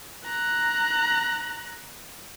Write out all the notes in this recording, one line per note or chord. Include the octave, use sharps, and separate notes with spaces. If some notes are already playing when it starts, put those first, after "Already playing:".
A#5 F#6